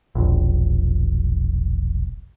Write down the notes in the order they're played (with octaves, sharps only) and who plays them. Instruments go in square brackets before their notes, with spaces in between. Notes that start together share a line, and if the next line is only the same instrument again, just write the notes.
[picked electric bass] E1 A#1